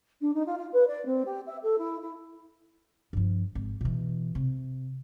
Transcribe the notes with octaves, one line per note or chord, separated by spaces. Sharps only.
D4
D#4
F4
F4
B4
D5
C4
G4
E5
A4
E4
E4
G2 F3
G#1
B2 E3
C3